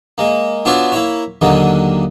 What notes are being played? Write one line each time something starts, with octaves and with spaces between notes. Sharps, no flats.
G#3 A#3
B3 D4 F4 F#4 C#5 E5
A#3 E4 C#5
D#2 D3 D#3 F#3 A#3